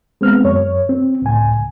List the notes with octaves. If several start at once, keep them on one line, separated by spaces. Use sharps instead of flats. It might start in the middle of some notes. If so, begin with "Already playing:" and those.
G#3 B3 C4 F6
F#2 C#5
C4
C#2 A2 G#5